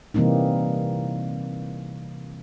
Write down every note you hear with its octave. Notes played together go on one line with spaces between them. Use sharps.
C3 E3 G3 A#3 C4 D#4